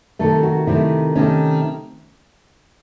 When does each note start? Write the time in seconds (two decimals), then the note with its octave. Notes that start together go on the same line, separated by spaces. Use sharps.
0.19 C3 D#3 A3 A4
0.43 F#4
0.67 C3 D#3 A3 E4
1.15 C3 D#3 A3 C#4